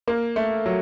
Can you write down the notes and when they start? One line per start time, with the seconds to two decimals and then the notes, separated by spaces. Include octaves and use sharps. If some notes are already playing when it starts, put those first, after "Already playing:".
0.08 A#3
0.36 A3
0.66 F#3